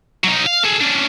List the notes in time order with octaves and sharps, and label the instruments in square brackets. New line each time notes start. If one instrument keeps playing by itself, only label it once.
[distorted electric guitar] F#3 D#4
F5
G#4 A4
C#4 D4